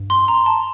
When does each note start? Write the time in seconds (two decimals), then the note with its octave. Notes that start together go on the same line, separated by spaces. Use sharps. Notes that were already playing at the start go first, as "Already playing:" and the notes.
Already playing: G2
0.10 C6
0.28 A#5
0.46 A5